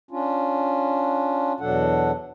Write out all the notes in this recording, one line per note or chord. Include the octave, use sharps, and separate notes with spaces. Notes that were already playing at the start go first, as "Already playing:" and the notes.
C#4 D4 F4
E2 B2 F#3 D4 A4 F#5